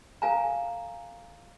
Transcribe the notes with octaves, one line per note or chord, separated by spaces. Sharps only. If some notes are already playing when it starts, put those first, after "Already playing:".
A4 F5 G#5 A#5